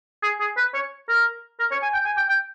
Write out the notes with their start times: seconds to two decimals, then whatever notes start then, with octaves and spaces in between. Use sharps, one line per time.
0.23 G#4
0.40 G#4
0.57 B4
0.74 C#5
1.09 A#4
1.60 A#4
1.72 C#5
1.82 G#5
1.93 G5
2.05 G#5
2.17 G5
2.28 G5